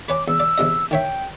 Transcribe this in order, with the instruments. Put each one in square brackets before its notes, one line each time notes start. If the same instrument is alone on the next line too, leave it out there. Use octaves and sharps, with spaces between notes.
[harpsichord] B4 C#5 G#5 [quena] D6
[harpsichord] E2 [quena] E6
[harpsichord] D5
E2 C3 D#5
[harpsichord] D#3 C#5 E5 [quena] G5